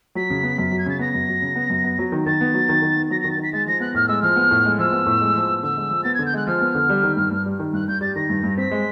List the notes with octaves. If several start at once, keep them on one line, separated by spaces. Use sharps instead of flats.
F#3 B6
C#3
B3
F#2
F#3
G#6
C#3 A6
B3 A#6
F#2
F#3
C#3
B3
F#2
B3
F#3
D#3
D#3 A6
B3
F#3
D#3
D#3
B3
F#3 A#6
D#3 A#6
A6
D#3 B6
G#3 A6
F3 A#6
B3 F#6
A2 F6
G#3 E6
F3 F6
B3
A2
G#3
F3 E6
B3
A2
G#3
F3
B3
D3 E6
G#3
F3
B3 A6
G#6
D3
G6
G#3 F#6
F3 F6
B3
D3
G3
D#3
G2
G2
G3
D#3
G2 F#6
G2 G6
G3 A6
D#3 A#6
G2
G2
C4 B6
G#3